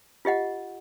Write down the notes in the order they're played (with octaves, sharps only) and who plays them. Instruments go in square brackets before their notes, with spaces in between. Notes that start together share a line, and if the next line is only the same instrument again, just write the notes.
[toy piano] F4 G4 D#5 F#5